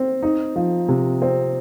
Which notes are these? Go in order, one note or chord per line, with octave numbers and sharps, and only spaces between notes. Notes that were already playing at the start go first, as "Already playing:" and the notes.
Already playing: C4
D#4
F3
C3
C4